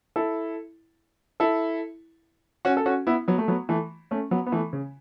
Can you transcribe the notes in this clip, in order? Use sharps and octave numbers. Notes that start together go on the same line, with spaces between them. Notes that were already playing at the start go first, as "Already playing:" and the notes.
E4 A4
E4 A4
C#4 F#4
A4
C#4 F#4
B3 E4
F#3 B3
A3
F#3 B3
E3 A3
A3 C#4
F#3 B3
B3
E3 A3
C#3